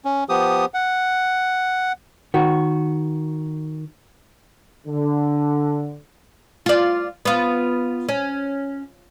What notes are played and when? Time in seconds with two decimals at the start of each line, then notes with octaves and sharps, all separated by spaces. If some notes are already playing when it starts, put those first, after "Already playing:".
0.05 C#4
0.29 F3 B3 G4 D#6
0.74 F#5
2.34 D#3 F#4
4.87 D3
6.66 F4 D5
7.25 B3 F4
8.09 C#4